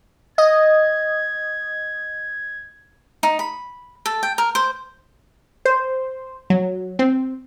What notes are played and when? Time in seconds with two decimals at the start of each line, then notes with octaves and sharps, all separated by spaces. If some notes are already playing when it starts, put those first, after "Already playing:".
0.38 D#5 G#6
3.23 D#4
3.39 B5
4.06 A4
4.23 G5
4.38 A#4
4.55 C5
5.65 C5
6.50 F#3
6.99 C4